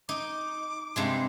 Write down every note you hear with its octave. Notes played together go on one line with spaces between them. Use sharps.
D#4 D6
G2 C3 G#3